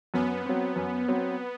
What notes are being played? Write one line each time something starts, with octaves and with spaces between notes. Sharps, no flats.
F#2 B3
F#3 C4
F#2
F#3 C4